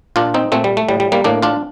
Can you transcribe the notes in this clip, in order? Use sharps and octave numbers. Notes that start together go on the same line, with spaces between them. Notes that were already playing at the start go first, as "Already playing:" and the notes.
A#2 D4 F4
C4 D#4
A#2 A3 C4
G3
A3
A2 G3
G3
G3 A#3
A2 A#3 D4
D4 F4